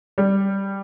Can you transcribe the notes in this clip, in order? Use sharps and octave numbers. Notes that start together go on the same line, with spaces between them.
G3